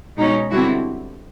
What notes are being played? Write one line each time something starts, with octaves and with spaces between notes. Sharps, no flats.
B2 G#3 C#4 D#4
D3 G3 C4 E4 F#4